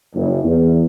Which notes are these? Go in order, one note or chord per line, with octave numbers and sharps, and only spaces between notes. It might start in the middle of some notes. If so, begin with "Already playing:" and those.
F#1
E2